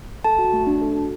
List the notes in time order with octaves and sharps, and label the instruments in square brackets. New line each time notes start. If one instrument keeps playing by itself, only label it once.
[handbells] A4 A5
F#4
A3
D4
A4
F#4